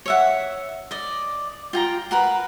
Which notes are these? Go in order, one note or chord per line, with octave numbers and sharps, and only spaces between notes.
C#5 E5 F#5
D5 D#5
F4 G5 A#5
F#4 A#4 B4